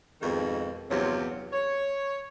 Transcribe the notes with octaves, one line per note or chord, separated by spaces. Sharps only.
F2 G#2 B2 D#3
E2 G2 C3 F3 F#3
C#5